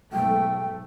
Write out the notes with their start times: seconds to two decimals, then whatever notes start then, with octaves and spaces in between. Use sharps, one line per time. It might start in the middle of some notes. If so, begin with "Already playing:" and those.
0.13 B1 G#2 A3 G5